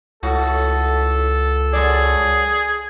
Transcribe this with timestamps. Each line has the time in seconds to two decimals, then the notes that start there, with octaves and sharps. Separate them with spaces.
0.23 C#2 A2 F#4 A4
1.73 F#2 G#4 D5